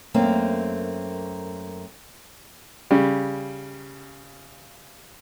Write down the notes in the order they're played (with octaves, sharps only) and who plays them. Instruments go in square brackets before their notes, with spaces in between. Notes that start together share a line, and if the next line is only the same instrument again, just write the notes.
[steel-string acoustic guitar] F#2 A3 A#3 C4 A#5
[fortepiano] C#3 G3